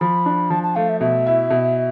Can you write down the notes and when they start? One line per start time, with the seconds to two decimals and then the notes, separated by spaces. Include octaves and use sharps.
0.01 F3 B5
0.26 D4
0.50 F3 A5
0.63 A5
0.75 A3 F5
0.89 E5
1.00 B2 E5
1.26 E4
1.50 B2